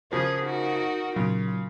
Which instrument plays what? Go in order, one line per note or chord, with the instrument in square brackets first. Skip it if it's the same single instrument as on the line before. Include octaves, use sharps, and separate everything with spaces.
[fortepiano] C#3 F3 A#3 [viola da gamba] G#4
[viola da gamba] D#4 F#4 A#4
[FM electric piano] A#2 F#3 [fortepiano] C#3 [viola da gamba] F4